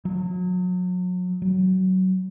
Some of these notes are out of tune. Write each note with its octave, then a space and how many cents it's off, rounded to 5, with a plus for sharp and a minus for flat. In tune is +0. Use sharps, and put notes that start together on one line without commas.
F#3 -35
F#3 +15